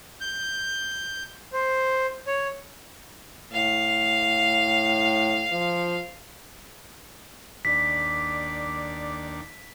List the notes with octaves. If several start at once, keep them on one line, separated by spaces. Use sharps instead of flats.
G6
C5
C#5
A2 F5
F3
D#2 D4 D5 B6